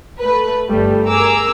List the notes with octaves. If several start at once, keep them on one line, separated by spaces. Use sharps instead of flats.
A3 B4
G1 G3 A3
G#4 A#4 A#5 D6 E6